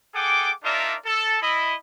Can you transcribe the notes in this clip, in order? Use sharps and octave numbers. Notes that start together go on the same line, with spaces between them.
G#4 A4 F#5 G5 D6
D4 D#4 F4 A#4 D5 E5
A4
E4 D#5 B5